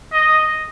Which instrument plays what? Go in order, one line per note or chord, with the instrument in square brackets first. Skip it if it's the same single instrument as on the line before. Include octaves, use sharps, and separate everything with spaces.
[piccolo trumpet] D#5